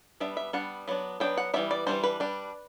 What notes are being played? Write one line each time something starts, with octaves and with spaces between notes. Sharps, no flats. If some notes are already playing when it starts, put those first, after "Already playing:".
G3 B3 D4 E5
E5
G3 B3 D4 F#5
F#3 B3 D4
F#3 B3 D4 G5
F#5
E3 G3 B3 D4 E5
D5
E3 G3 B3 D4 C5
B4
G3 D4